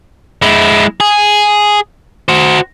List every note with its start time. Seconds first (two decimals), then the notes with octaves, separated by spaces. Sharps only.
0.42 G#3 E4
1.00 G#4
2.29 F#4 C5